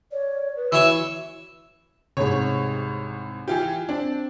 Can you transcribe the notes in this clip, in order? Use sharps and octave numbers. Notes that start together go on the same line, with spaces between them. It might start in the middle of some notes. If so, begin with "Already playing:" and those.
C#5 D5
B4
E3 F#4 C#5 C#6 E6
C2 G#2 C#5
E3 F4 G4
C4 D4